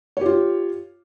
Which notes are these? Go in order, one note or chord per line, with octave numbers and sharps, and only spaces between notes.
F4 G4 C#5